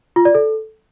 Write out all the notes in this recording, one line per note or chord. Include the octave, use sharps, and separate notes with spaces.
F4
D5
A4